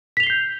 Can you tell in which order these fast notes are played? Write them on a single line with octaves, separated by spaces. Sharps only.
B6 F7 G7 C7 G6